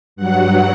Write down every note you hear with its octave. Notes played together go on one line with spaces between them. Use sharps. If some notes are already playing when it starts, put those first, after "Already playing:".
G2 F#3 F#5